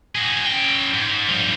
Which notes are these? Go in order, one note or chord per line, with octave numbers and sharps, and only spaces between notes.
F#4 G#4
C#4 G5
G#2
G2 F3